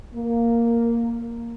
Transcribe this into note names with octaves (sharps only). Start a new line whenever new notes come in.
A#3